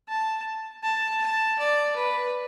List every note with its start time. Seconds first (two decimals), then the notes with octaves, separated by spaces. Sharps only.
0.09 A5
0.83 A5
1.22 A5
1.59 D5
1.96 B4